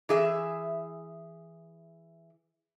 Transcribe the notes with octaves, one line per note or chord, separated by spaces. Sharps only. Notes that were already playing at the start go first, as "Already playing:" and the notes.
E3 G#4 E5